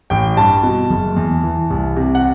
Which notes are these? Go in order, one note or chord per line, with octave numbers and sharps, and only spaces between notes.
A1 G5
G2 A5
B2
F#1
E2
E3
C2
C3
F#5